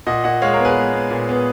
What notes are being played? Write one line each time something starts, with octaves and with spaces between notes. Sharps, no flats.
A#2 D#5 F#5
A#2 D#5 F#5
G#3 C#5 F5
A#4 C#5
B3
G#4 B4
G#3
B3
A#2
B3